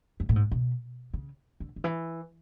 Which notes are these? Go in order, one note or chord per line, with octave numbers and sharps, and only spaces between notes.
F#2
A2
G#2
B2
C#3
D3
D3
E3